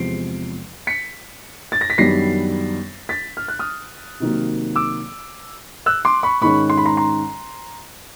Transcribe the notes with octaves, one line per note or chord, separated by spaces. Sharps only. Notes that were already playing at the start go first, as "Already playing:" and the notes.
Already playing: E2 C3 F3 G#3 C7 D7
B6 C#7
A6
A#6
B6
F#2 D#3 G3 B3 D4 A#6 C7
A6 B6
F6
F#6
D#6 F6
C3 D#3 F#3 A#3
D6 E6
E6 F#6
C6 D6
B5 C#6
G#2 D#3 G#3 C#4 B5 C#6
C6
B5
A#5 C6
A#5 C6